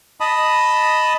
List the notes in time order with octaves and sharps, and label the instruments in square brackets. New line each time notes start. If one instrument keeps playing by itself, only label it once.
[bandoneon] D#5 A5 B5 D#6